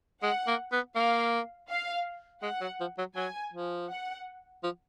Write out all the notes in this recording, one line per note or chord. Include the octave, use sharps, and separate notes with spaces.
G#3 F#5
A#3
B3
A#3 F5
F5
G#3 F#5
F#3
F3
F#3
F#3 G#5
F3
F#5
F3